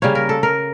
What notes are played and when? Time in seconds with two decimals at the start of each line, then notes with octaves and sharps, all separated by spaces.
0.02 C#3 G3 A#3 C#5
0.15 A#4
0.29 A4
0.43 A#4